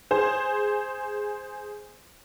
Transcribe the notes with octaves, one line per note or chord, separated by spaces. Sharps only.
G#4 C5